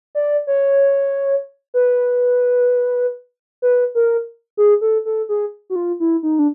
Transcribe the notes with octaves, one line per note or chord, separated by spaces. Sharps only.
D5
C#5
B4
B4
A#4
G#4
A4
A4
G#4
F#4
F4
E4
D#4
D4